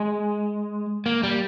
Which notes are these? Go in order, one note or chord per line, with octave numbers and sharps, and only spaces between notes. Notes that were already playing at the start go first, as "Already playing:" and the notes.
Already playing: G#3
A#3
G3